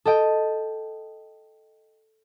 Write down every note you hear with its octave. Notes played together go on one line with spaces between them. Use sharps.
A4 D#5 G5